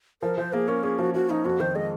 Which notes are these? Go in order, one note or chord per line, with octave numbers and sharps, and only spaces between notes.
F3 A#4
F3 C5
A#3 G#4
C#4 A#4
C#4 G#4
F3 F#4
F3 F#4
F3 D#4
F2 F#4
D#3 C5
G#3 D#5